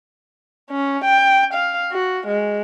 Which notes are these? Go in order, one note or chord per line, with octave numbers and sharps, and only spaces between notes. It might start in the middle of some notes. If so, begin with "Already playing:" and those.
C#4
G5
F5
F#4
G#3